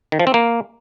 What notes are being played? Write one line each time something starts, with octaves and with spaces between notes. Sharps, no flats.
D#3
F3
C4
A#3